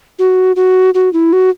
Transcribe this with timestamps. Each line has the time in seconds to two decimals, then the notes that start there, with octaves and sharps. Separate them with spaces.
0.19 F#4
0.56 F#4
0.94 F#4
1.13 E4
1.33 F#4